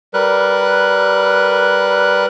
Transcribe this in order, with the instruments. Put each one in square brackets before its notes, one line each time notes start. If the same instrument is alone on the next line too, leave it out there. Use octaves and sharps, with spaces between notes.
[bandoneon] G3 A#4 B4 F#6